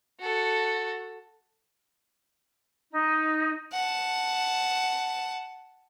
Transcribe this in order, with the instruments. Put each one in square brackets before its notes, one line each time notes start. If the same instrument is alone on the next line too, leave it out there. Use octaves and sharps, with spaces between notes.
[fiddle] F#4 A4
[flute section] D#4
[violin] F#5 A5